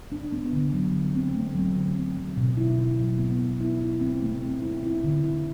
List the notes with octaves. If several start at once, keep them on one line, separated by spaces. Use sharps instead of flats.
D4
B3
D3
F#3
D3
C4
A3
F#3
D3
C4
F#3
B2
E4
E4
F#3
B3
B3
E4
E4
C4
A3
C4
E4
E4
D3
E4